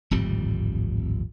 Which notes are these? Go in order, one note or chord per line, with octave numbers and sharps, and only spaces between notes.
D1 G#1 F2 G3